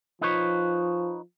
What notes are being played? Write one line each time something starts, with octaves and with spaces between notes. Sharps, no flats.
F3 D#4 B4 C#5